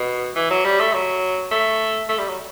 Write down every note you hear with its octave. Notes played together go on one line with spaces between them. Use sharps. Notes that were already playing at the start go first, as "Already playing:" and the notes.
Already playing: B2
E3
F#3
G3
A3
F#3
A3
A3
G3
F#3